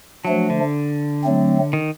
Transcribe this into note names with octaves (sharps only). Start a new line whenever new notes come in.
F3 F#3 A3 D4
D3
F#3 A3 C4
D#3